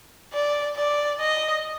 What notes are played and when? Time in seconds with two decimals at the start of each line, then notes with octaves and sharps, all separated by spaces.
0.33 D5
0.77 D5
1.20 D#5